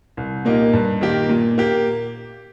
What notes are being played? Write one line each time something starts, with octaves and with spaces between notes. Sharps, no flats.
C2
A#2 A#3 D#4 G4
G2
D#3 A#3 G4
A#2
A#3 G4